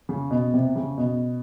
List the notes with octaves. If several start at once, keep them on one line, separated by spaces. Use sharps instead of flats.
C#3
B2
C3
C#3
B2